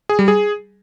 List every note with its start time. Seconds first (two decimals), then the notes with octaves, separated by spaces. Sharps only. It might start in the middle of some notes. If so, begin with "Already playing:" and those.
0.09 G#4
0.19 G3
0.28 G#4